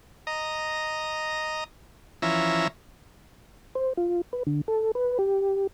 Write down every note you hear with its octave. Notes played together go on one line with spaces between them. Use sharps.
D#5 A#5
E3 F3 C#4 E5 A#5
C5
F4
B4
D3
A4
B4
G4